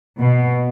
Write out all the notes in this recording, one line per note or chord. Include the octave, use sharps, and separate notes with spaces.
B2